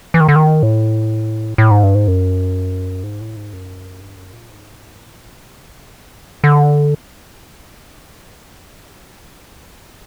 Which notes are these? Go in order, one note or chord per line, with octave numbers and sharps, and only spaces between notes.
E3
D#3
D3
D#3
A2
A2
G#2
G2
G#2
F#2
G#2
A2
G#2
F#2
G2
F#2
A#2
G#2
A2
A#2
B2
C#3
C3
D3